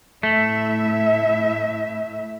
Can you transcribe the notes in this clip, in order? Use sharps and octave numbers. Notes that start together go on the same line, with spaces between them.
A2 A3 E4 E5